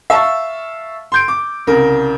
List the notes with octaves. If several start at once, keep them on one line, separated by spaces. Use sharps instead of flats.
E5 F5 A5 C#6
C6 G6 D7
D6
C2 C#3 A#4